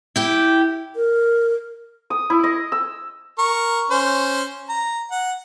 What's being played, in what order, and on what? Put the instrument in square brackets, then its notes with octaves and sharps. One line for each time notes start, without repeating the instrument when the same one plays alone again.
[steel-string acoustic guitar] E4 G4
[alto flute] A#4
[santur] D#6
E4
D#5
E6
[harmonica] A#4 C#6
C#4 C5
A#5
F#5